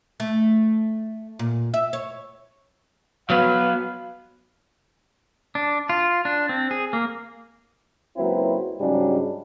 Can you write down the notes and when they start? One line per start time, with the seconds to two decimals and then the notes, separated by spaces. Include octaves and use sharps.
0.20 A3
1.39 A#2
1.74 E5
1.93 C#5
3.30 F#3 B3 B4 F5
5.55 D4
5.89 F4
6.25 D4
6.49 C4
6.71 G#4
6.93 A#3
8.17 C#2 F#3 A#3 C4 E4 B4
8.79 G#2 C#3 F#3 G3 C#4 D4